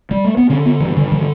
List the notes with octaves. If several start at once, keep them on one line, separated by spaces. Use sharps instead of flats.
G3
A3
B3
D3 C#4
B3
G2 E3
D3
D3 E3